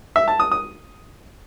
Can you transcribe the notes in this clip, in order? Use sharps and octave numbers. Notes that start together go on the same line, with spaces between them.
E5
A5
D#6
D#6